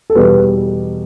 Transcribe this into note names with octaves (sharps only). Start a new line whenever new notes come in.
A4
E2 B2 G3 B4